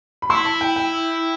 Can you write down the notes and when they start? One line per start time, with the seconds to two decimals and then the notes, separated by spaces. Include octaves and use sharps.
0.22 B5
0.30 E4 C6
0.45 A5
0.61 G5
0.76 G5